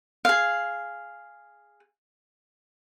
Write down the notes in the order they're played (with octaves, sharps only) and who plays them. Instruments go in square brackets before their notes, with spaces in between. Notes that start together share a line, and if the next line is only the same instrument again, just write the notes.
[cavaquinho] G#4 F5